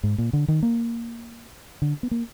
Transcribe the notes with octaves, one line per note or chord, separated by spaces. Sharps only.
G#2
A#2
D3
D#3
A#3
D3
B3
A#3